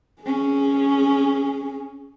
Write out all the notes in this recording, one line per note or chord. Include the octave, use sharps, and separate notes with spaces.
C#4 G#4